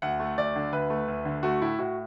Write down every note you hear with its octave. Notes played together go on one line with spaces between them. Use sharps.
D2 F#5
A3
D2 D5
D3
D2 B4
A3
D2
D3
A3 F#4
A2 E4
A2 F#4